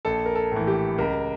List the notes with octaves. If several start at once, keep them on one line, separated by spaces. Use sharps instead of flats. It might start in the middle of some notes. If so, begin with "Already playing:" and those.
A#1 A4
A#4
A4
A2 E3
G4
C#2 A#4